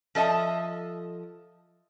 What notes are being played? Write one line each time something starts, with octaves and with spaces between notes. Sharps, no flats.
F3 A4 D#5 E5